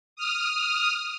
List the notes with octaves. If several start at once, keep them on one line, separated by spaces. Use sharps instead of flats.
D#6 F6